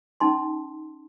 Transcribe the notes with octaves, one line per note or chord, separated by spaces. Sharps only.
C#4 D#4 A5 C6